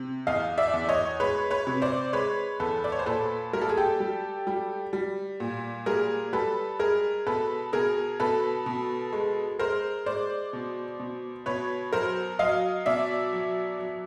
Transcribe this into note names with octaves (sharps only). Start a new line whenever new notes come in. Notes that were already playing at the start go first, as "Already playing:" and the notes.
Already playing: C3
E2 D#5 F5
D5 E5
E2
C#5 D#5
G#3 B4 C#5
B4 C#5
C3
C5 D5
G#3 B4 C#5
E2 A4 B4
D5
C#5
C5
A#2 A4 B4
G3 A#4
A4
G#4
G4 A4
G3
G3
G3
A#2
G3 G#4 A#4
G3 A4 B4
G#3 G#4 A#4
B2 A4 B4
B2 G#4 A#4
B2 A4 B4
B2
G#3
G#3 A#4 C5
G#3 C5 D5
B2
B2
B2 B4 C#5
F#3 A#4 C5
F#3 D#5 F5
B2 D5 E5
F#3
F#3